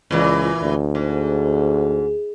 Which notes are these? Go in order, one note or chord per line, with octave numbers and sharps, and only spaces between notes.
C#2 A#2 E3
D2
G#2